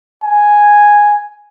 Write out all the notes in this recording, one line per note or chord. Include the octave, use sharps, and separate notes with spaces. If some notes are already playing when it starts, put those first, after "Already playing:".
G#5